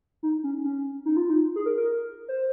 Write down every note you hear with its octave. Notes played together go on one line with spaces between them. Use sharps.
D#4
C#4
C#4
D#4
F4
D#4
G#4
A#4
A#4
C5